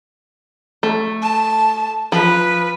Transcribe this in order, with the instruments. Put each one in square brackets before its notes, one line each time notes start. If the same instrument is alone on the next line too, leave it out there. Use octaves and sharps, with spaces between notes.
[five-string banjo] A3
[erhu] A5
[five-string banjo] F3 [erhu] B4